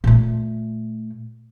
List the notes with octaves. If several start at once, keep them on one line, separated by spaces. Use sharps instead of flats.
A#2 A3